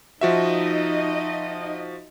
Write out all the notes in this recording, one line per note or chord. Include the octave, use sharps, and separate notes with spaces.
F3 D#4 F#4 D#5 E5